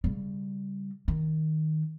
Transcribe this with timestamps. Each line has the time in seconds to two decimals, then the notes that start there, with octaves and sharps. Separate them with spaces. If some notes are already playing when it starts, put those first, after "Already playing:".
0.04 C#3 G3
1.08 D#3